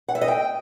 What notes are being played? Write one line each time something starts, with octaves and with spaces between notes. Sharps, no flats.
F#5
E5
D#5
G5